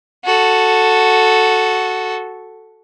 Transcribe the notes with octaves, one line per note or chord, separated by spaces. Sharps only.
F#4 A4